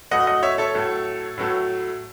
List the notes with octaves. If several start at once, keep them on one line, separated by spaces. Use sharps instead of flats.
A2 F#3 A3 D#5 F#5
D#5 F#5
C#5 E5
A4 C#5
A2 F#3 A3
A2 F#3 A3